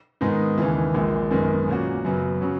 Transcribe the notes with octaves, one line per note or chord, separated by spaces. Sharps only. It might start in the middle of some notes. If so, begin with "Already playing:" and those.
G#2 D#3 G#3 B3 D#4
D#2 C#3 E3
A#1 A#2 G#3
F#2 D#3 G#3 B3
A#2 A#3 C#4 F#4
F#2 C#3 F#3 B3
C#3 F#3 C#4